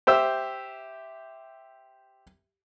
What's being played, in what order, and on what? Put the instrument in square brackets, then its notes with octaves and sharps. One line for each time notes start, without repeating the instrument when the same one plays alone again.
[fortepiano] G4 C5 E5 E6